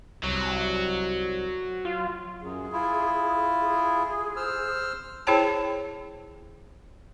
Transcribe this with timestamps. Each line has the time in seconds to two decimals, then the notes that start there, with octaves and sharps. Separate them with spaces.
0.24 C2 F#3
1.85 F4
2.42 F#2 G#4
2.73 E4 F4
3.62 G#4
4.36 C5 E6 F6
5.27 E4 G#4 C5 C#5 G5 A5